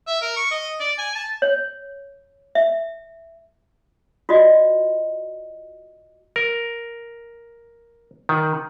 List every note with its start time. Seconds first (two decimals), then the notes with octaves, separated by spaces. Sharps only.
0.07 E5
0.22 A#4
0.37 C#6
0.51 D#5
0.80 D5
0.98 G#5
1.15 A5
1.42 C#5
2.55 E5
4.29 F4 F#4 D5 D#5
6.36 A#4
8.29 D#3